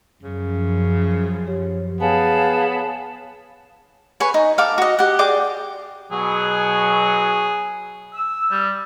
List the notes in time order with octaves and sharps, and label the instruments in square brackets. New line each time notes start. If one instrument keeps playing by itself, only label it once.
[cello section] F#2 F3 [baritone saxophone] C#3
[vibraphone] G4 C#5
[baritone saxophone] B3 [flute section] G#4 F5 A5 [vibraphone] C#5 G#5
[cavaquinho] B4 C#5 G#5 C#6
D#4
A4 F5 G5 D6
F#4 D#5
G4 F#5
G#4 D5 G5 D6
[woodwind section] B2 F#3 [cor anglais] G#4
[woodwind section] E6
[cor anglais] G3